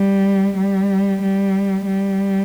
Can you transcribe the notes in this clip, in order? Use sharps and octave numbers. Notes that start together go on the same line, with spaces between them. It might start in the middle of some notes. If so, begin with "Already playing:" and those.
Already playing: G3
G3
G3
G3